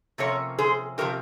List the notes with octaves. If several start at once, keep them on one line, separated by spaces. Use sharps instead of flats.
C3 F3 A#3 C#4 A#4 C#5
G#4 C5
C3 F3 A#3 C#4 G4 A#4